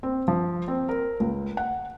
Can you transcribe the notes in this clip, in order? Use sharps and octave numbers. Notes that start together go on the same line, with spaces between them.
C4
F3
C4
A#4
C#2
F#5